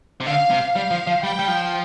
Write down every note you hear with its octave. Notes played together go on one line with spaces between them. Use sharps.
C3
D3 F5
C3
G3 F5
F3
F3
G3 G5
G3
F3